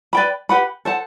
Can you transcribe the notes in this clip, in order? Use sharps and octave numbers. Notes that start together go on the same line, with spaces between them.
B4 D5 G5 B5
G4 B4 F#5 B5
A4 C5 F#5 A5